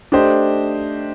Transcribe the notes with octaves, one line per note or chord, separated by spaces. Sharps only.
A3 D4 G4 C5 D#5